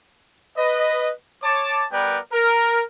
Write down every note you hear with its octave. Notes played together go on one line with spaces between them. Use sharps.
B4 D#5
C#5 A5 D6
G3 B3 A#4 B4 D5 G5
A#4